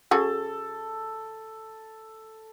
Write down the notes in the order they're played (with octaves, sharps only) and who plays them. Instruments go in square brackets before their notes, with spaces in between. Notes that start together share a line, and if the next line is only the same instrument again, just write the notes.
[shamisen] C#3 F#4 G#4 [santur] A4